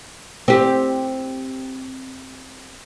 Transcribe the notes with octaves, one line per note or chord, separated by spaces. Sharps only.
C4 G4